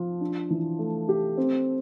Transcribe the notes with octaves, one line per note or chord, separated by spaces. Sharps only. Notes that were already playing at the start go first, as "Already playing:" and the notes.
Already playing: F3 F4
D4
E3
A3
G4
C4